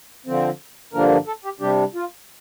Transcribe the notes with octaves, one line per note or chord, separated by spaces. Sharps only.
D3 F3 C4
G2 D3 F3 A#3 D4 A#4
A4
G4
C3 G3 D4 G4
F4